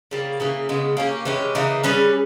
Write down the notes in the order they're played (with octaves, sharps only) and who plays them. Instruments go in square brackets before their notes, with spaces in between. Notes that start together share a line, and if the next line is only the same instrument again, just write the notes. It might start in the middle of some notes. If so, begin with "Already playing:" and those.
[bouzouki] C#3 G3 A#3
C#3 E3 A#3
C#3 G#3 B3
A#3 C#4 G4
E3 G#3 C#4 G4
C#3 E3 A#3 D#4
G3 C#4 G#4 B4